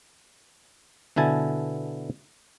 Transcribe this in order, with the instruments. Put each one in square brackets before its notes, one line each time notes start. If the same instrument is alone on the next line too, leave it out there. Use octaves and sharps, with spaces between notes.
[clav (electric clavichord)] B2 D3 E4 G#5 A5